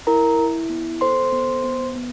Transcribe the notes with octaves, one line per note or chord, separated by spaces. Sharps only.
E4 A#4 A#5
E4
B3
A4 C5 C6
B3
B3
B3